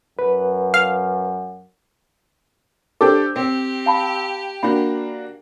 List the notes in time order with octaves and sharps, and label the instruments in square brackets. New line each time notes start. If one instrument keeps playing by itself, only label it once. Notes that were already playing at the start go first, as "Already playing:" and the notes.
[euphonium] F#2 [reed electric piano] B4
[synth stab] F5
[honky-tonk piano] D4 G4 A4 [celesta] C5 D6
[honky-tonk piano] C4 [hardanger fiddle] G4
[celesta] F5 A5 B5
[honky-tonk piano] A#3 D4 F#4 [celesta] B5